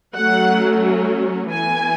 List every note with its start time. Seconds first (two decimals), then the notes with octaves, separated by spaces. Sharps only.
0.16 F#3 A3 C#4 F#5
1.50 E3 B3 G#5